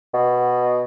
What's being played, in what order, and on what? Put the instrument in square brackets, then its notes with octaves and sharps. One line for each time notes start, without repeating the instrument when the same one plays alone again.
[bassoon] B2